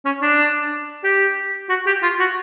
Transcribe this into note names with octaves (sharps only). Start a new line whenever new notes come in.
C#4
D4
G4
F#4
G4
F4
F#4